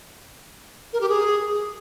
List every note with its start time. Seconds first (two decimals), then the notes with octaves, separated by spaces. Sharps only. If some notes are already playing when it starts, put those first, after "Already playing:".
0.93 A#4
1.01 G4
1.09 G#4